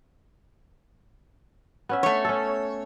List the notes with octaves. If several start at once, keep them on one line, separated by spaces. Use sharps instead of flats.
B3 C#4 E5
A3 C#5
C#4 A4